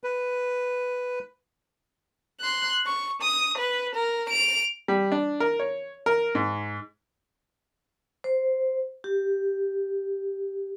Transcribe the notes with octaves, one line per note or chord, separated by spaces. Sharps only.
B4
C6 F#6
C#6
D#6
B4
A#4
D7 F7
G3
D4
A#4
C#5
A#4
G#2
C5
G4